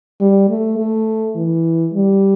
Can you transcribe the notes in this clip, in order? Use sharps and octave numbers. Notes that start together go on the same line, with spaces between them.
G3
A3
A3
E3
G3